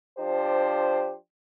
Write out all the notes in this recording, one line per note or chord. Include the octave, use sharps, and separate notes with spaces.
F3 D4 G4 C5